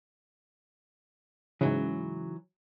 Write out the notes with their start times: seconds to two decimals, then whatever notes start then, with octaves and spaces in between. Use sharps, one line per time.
1.61 G#2 C#3 E3 F#3